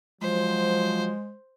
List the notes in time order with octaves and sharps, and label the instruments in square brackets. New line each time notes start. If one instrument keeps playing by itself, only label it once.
[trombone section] F3 F#3 [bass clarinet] G#3 [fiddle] C5